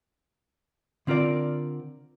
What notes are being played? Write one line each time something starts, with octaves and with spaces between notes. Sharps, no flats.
D3 C4 F4 A#4 D5